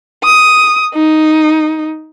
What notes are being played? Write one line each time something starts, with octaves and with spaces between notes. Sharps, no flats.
D#6
D#4